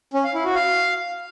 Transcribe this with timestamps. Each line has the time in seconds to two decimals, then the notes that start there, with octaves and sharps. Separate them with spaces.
0.14 C#4
0.24 F5
0.34 E4
0.45 F#4
0.55 F5